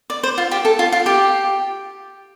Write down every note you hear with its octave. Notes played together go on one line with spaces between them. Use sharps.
D5
C5
F4
G4
A4
F4
F4
G4